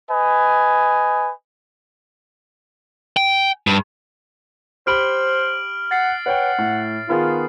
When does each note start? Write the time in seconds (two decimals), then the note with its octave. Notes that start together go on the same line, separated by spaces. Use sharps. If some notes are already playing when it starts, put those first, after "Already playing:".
0.10 B4 D#5 G#5
3.17 G5
3.67 G2
4.87 G4 C5 B5 F6 D7 F#7 G7
5.91 F#5 A6 C7
6.26 B4 C#5 F#5 G5
6.58 A2
7.09 D#3 B3 F4 G#4